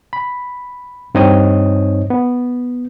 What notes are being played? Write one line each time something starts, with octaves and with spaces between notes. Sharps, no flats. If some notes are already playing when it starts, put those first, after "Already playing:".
B5
G2 C4 D#4 C#5 D#5 D#6
B3